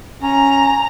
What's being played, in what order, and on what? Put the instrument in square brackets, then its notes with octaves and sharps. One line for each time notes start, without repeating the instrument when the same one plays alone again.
[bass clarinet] C#4 [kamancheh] A#5